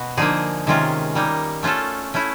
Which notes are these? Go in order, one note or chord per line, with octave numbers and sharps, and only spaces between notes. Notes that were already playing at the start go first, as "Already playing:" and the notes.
Already playing: B2 B3 F#4
D3 F3 A#3 D#4 G#4
C3 D#3 G#3 C#4 F4
G3 A#3 D#4
A3 C#4 F4 A4
A3 C#4 E4